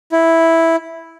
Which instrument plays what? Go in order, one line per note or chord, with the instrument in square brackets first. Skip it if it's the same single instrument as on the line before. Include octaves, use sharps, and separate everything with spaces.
[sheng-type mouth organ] E4